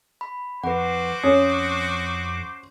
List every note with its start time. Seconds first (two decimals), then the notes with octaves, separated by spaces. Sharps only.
0.21 B5
0.64 F2 F#4 B4 C5 F#5 D6
1.23 F2 C#4 D#6